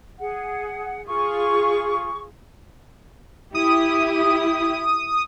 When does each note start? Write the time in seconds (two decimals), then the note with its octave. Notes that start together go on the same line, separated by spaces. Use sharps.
0.19 G#4 F#5
1.07 F4 G#4 C#6
3.55 E4 G4 D#6